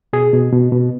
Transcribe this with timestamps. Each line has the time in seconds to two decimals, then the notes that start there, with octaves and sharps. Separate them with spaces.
0.13 B2 G#4
0.33 B2
0.52 B2
0.72 B2